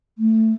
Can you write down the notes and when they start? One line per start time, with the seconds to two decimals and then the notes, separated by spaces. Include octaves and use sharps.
0.18 A3